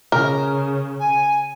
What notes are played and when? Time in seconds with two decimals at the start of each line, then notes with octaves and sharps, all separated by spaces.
0.12 C#3 A#4
1.00 G#5